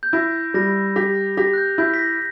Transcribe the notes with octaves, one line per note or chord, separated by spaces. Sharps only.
G6
E4 A#6
G3 A#6
G4 A#6
G4 A#6
F#6
G6
E4 G6
B6
A#6